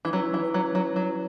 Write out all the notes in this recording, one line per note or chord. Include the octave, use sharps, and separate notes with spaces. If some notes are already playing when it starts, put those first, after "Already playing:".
E3
F#3 C#4 E4 B4
E3
F#3
F#3
F#3